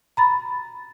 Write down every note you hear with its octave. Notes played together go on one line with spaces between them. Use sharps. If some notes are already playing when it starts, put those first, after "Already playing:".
A#5 B5 A6